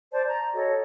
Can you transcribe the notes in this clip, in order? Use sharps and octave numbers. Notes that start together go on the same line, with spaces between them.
C5 D5 A5
A#5
F#4 A4 C#5 D#5